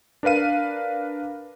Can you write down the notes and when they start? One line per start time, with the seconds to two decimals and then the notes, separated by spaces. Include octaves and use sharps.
0.23 D4 A#4 B4 F5 D#7